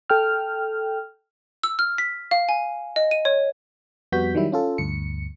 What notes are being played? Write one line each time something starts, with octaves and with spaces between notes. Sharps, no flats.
A4 G5 F6
E6
F6
B6
F5
G#5
D#5
D#7
C#5
F2 G3 B3 F#4 G6 B6
D#3 F#3 G3 E4
C#4 F4 A4
D2 G2 C#7